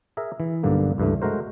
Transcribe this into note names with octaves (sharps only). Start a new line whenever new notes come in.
G#4 A#4 E5
E3
B1 G2 D3 A#3
C#2 G2 E3 A3
G#3 A3 F#4 A#4 C5